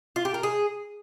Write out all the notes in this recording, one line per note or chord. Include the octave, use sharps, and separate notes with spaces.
F4
G4
A#4
G#4